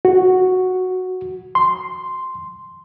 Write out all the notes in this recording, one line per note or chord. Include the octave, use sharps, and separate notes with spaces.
F#4
C6